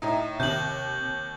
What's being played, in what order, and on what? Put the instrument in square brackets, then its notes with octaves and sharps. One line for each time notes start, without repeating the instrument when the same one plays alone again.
[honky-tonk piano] A2 D#4
[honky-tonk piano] D#2 [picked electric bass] C3 [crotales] G6 F#7